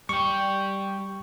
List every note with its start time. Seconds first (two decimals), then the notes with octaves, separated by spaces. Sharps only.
0.09 G3 G5 C#6